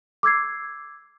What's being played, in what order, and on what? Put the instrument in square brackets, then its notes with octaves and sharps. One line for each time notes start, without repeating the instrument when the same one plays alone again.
[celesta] D6 E6 G#6 C7